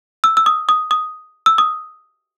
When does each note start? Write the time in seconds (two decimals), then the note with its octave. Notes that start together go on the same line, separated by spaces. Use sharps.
0.24 E6
0.37 E6
0.46 D#6
0.69 D#6
0.91 D#6
1.46 E6
1.58 D#6